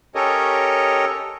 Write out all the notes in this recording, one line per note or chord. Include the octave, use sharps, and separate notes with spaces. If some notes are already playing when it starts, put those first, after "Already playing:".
C#4 G4 A4 A#4 C#5 D#5